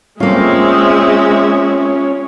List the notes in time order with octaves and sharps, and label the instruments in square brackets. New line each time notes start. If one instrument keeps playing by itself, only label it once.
[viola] G#3 E5 [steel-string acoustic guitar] A#3 F4 [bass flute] C4 [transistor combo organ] C#4